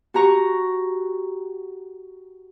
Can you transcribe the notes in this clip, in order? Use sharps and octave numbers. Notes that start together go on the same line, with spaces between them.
F#4 G4 A#5 C#6